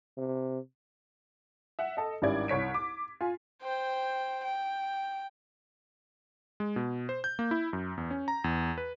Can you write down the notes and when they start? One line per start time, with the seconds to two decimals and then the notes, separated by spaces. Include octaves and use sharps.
0.18 C3
1.79 E5 F#5
1.97 A4 D#5
2.22 G#1 G3 C#4 E4 D5 G#6
2.48 C2 C#5 B6 D7
2.74 D6
3.21 F4 G#5
3.63 C5 G5
4.44 G5
6.60 G#3
6.76 B2
7.09 C5
7.24 G6
7.39 A#3
7.51 E4
7.73 F#2
7.97 E2
8.11 C#4
8.28 A#5
8.44 E2
8.78 B4